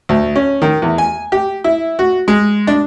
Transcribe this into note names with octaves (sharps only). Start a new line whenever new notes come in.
D2
C#4
D#3
E2
G#5
G4
E4
F#4
G#3
D4